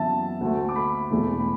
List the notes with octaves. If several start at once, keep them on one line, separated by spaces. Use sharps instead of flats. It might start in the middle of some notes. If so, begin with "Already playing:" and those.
Already playing: F#2 E3 B3 E5 A5
D2 D3 A3
D6
B5
E1 E2 E3 A3
B5